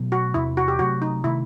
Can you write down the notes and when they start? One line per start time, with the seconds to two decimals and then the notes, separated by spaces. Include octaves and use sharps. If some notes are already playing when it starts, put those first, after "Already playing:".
Already playing: B2 F#3 A3
0.12 F#4
0.34 E2 C3 E3 E4
0.57 F#4
0.68 G4
0.79 C3 F#3 A3 F#4
1.02 D#4
1.24 C3 D#3 A3 E4